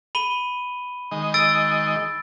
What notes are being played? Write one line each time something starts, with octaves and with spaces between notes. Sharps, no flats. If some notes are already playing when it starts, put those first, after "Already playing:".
B5 D#7 G7
D#3 G#3 D#5
E6 A6 D7